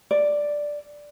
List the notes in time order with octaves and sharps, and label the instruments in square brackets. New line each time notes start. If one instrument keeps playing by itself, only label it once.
[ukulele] D5